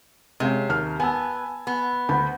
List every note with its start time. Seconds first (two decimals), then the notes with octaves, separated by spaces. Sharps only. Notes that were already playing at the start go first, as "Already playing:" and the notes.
0.40 C3 G#3 C#4 F5
0.69 D#2 F6
1.00 B3 G#5 A5 E6
1.67 B3
2.09 D2 B5